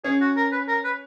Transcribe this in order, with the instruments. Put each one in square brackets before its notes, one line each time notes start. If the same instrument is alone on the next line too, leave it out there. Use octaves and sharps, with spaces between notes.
[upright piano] C#4 [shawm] G#4
[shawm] F#4
A#4
B4
A#4
B4